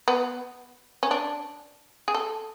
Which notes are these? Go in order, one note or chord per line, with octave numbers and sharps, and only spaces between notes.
B3
C#4
D4
G#4
A4